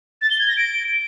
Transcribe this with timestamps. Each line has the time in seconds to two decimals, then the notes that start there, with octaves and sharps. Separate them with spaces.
0.22 A6
0.30 G7
0.39 G#6
0.48 A#6
0.57 D7